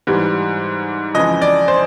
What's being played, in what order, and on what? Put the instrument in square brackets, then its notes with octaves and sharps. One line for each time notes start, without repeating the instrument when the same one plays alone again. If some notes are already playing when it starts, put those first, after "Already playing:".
[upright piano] G#2 E3 G3
F2 C#3 E3 G#3 D#5
D5
C5